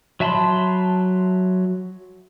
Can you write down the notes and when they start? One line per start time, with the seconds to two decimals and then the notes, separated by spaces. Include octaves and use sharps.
0.20 F#3 E5 A5 B5 C6